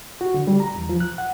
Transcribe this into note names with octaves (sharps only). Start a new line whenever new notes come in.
F#4
D3
G3
A#5
E2
F3
F#6
F#5